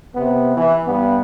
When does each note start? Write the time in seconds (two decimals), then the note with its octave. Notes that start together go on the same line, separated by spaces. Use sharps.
0.16 C3 B3
0.57 E3
0.87 G2 B3